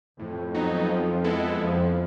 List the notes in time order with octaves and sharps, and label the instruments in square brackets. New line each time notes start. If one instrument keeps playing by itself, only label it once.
[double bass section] F2 [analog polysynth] A2
[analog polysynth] F#3 B3 D#4
F3
G#3 B3 E4 A4
[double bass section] F2 [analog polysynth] F3